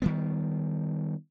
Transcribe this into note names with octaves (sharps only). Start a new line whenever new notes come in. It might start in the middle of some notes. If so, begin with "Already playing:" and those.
D#3 G3 B3